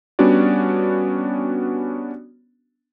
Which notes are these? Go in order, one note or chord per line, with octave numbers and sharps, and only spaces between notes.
G3 B3 C#4 D4 F#4 D5